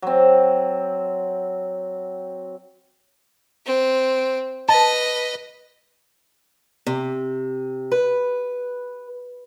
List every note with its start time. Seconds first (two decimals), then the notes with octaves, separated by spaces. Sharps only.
0.02 F#3 C4
3.66 C4
4.68 B4 D#5 A5
6.86 C3
7.92 B4